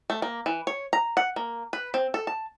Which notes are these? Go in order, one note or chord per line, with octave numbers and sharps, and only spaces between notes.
A3
A#3
E3
C#5
A#5
F#5
A#3
B4
C4
A4
A5